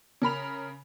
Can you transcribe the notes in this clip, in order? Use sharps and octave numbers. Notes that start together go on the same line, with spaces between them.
C#3 A#4 B5 F7